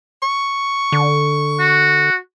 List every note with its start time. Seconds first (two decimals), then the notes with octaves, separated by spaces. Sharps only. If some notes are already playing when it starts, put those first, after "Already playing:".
0.23 C#6
0.92 D3
1.59 F#4